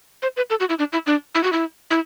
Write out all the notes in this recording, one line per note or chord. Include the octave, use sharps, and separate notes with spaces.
C5
B4
A4
F#4
E4
D4
E4
D4
E4
F#4
E4
E4